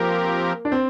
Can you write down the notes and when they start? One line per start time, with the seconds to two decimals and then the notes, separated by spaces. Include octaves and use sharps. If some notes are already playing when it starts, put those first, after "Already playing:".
Already playing: F3 A#3 C4 G4 A#4
0.65 D4
0.72 C4